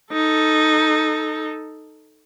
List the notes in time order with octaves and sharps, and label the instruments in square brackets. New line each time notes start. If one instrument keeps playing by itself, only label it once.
[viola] D#4 A4